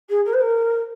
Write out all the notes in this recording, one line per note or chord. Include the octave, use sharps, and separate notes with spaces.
G#4
A#4
C5
A#4